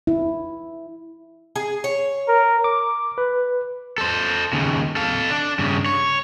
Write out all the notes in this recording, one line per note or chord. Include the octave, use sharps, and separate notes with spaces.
E4
G#4
C#5
A#4
D6
B4
A4 C5
D#2 C#3
A4 F5
D4
G2 C#3
C#5